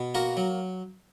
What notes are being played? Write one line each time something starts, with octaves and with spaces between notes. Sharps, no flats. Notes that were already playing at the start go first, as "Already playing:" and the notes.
Already playing: B2
A#3 F#4 A#4
F#3